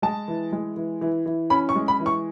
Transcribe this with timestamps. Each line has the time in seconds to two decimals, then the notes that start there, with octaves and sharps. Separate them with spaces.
0.02 G#3 A5
0.28 E3
0.52 G#3
0.76 E3
1.01 E3
1.26 E3
1.50 C#4 B5
1.69 C#6
1.76 G#3
1.88 B5
2.00 E3
2.06 C#6